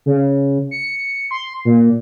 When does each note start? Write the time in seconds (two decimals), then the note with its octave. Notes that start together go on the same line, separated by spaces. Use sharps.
0.06 C#3
0.71 C#7
1.31 C6
1.65 A#2